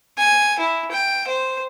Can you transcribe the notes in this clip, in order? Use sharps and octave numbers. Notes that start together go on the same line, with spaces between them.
G#5
E4
G5
C5